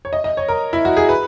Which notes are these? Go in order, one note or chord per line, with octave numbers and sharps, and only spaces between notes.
C#5
D#5
D#5
C#5
A#4
E4
F#4
G#4
B4